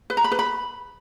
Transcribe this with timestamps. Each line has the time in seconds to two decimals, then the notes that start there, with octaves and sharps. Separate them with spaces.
0.10 B4
0.17 A#5
0.24 B5
0.32 B4
0.39 B5